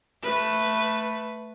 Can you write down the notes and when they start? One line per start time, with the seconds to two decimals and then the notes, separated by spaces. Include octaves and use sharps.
0.23 A3 B4